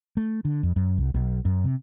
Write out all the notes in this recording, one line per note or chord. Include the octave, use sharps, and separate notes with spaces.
A3
D3
F2
F#2
C2
B1
F#2
C3